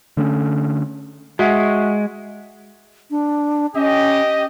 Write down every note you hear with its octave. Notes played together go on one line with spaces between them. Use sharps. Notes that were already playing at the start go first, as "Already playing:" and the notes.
D3 A3 C4 C#4
G#3 F#4 E5 F#5
D4
C#4 G4 D#5